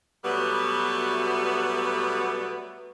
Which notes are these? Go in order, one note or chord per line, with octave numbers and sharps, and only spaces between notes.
B2 F#3 G3 A3 B3